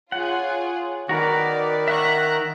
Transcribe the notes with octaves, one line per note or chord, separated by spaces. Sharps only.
F4 G#4 C#5 F#5
D#3 F#4 A#4 B4 D5
E5 F#5 A#5 C#6 F#6